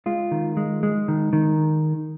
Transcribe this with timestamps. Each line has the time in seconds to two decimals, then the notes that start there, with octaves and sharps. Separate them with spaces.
0.06 G#3 F4
0.31 D#3
0.57 G#3
0.83 G#3
1.08 D#3
1.33 D#3